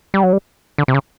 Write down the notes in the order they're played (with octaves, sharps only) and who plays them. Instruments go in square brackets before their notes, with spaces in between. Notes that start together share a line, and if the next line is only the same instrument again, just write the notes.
[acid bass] G3
F#3
G3
D3
C3
C#3